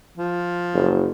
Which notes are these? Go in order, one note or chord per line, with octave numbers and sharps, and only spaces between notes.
F3
F#1